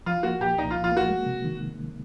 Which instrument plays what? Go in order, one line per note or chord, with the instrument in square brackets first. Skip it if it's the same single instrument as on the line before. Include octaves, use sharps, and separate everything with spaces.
[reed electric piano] F3 [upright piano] F4
[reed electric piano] A#3 [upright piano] F#4
[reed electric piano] A#2 [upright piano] G4
[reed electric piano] C2 [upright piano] D#4
[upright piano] F4
[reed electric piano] F3
[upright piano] F4
[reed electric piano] A#3 [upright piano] F#4
[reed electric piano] G#3
C3
D#3